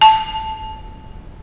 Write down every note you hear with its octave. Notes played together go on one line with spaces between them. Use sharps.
A5